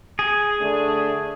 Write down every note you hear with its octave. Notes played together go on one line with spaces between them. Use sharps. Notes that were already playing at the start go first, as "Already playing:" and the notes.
G#4
D3 A3 D4